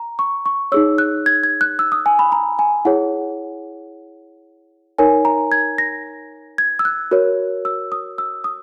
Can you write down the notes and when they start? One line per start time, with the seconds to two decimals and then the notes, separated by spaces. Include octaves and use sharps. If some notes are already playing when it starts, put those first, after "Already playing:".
Already playing: A#5
0.19 C#6
0.46 C#6
0.72 D#4 G#4 C#5 E6
0.98 F#6
1.26 G#6
1.44 G#6
1.61 F#6
1.79 E6
1.92 D#6
2.06 G#5
2.19 B5
2.32 A#5
2.59 G#5
2.85 E4 G#4 C#5 F#5
4.98 D#4 A#4 C#5 G#5
5.25 A#5
5.52 G#6
5.78 A#6
6.58 G#6
6.79 E6
6.85 F#6
7.11 F#4 A#4 C#5
7.65 E6
7.92 D#6
8.18 E6
8.44 D#6